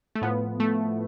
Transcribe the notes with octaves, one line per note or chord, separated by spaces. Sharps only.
A3
A2 F3 B3
A3